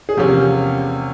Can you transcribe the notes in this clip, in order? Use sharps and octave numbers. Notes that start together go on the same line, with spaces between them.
G#4
E2 C3 F3 A#3 C#4 G4